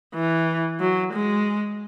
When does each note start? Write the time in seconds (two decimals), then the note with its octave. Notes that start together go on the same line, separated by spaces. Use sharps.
0.15 E3
0.80 F#3
1.13 G#3